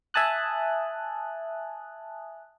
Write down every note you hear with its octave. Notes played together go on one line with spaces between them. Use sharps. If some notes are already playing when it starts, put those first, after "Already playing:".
E5 G#5 A5 D#6 F#6